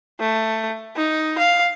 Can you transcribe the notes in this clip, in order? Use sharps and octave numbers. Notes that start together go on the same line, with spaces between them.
A3
D#4
F5